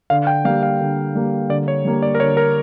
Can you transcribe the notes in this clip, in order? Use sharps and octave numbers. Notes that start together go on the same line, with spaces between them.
D3 F5
G5
G3 A#3 F5
F5
D3
G3 A#3
D3 D5
C#5
G3 A#3
D5
A#4
D3 C#5
A#4